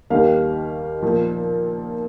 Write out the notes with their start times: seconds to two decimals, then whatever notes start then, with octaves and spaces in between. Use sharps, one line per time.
0.10 D#2 D#3 G3 A#3 F5
1.02 A#2 F3 A#3